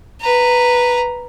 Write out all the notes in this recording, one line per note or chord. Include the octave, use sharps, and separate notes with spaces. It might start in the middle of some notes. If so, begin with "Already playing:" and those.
B4 A#5